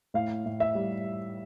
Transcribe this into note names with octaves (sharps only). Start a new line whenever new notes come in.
A2 F5
A2
E5
G3